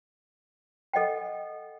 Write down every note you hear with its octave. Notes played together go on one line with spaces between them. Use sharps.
A4 D#5 F#5 G5